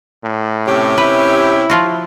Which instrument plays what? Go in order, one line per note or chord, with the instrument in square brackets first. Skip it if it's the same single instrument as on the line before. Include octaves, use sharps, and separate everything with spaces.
[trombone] A2
[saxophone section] C3 C#4 G4
[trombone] E4 [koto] B4
[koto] F3 F4 F#4